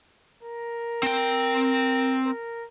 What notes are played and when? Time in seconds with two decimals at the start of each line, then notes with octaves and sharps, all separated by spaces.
0.43 A#4
1.03 C4 G5
2.26 A#4